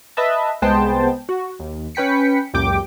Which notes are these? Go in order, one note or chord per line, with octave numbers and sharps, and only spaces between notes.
B4 D#5 E5 A5
C2 G#3 B3 C5 G5 A5
F#4
D#2
C#4 B4 G5 B6 C#7
C#2 F#2 A#2 G4 G5 D6